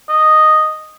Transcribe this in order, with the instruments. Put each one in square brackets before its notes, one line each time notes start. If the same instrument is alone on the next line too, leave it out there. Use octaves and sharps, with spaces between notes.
[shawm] D#5